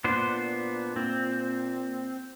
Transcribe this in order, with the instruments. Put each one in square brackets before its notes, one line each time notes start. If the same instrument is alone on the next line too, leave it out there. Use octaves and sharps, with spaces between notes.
[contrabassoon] A#2 [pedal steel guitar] B3 D4 C5
[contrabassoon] A#2 [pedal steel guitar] C4